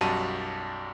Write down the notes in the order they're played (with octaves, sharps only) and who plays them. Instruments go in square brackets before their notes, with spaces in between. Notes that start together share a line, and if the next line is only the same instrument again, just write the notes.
[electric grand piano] B1 F#2 G3 F#4 A5 D#7